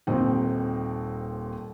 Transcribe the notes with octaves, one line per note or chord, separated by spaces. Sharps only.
D#1 D#2 C4 D#4 G5